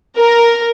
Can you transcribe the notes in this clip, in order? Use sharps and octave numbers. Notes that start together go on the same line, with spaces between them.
A#4